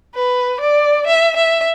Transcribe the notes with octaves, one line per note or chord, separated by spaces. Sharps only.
B4
D5
E5
E5